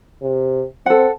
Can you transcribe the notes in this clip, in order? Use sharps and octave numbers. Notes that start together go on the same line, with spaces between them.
C3
C4 A4 F#5